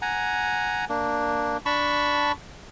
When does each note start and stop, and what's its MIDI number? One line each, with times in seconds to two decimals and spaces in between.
0.02 0.85 78
0.02 0.85 80
0.02 0.85 82
0.89 1.57 58
0.89 1.57 62
1.66 2.32 62
1.66 2.32 81
1.66 2.32 83
1.66 2.32 85